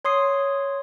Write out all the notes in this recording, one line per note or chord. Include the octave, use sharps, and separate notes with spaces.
C#5 C6 D#6 C7